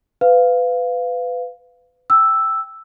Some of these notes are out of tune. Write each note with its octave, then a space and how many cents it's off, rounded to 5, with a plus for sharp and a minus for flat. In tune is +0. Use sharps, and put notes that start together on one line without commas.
B4 +25 F5 +0
G5 +0 E6 +0